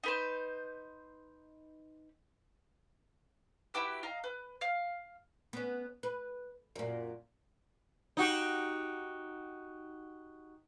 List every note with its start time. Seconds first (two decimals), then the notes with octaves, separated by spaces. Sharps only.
0.04 D#4 B4 C5
3.74 E4 F#4 G4 B4
4.03 D#5 F5 A#5
4.24 B4
4.61 F5
5.53 B3 C#4
6.03 B4
6.76 F#2 A#2
8.17 D#4 F#4 G4